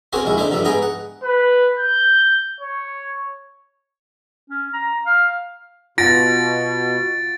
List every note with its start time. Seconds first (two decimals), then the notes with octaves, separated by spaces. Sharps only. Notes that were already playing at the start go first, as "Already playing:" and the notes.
0.13 A#3 C4 C#4 F#4 G#4 C5
0.25 A#1 D#2 G#3 E4
0.37 D4 D#4 A4 C5 E5
0.51 G2 D3 F3 G3 E5
0.65 G#2 B3 G#4 G5 A#5 D#6
0.82 F#5
1.23 B4
1.79 G6
2.60 C#5
4.50 C#4
4.73 A#5
5.06 F5
5.98 B2 F4 F#5 A6 A#6 D7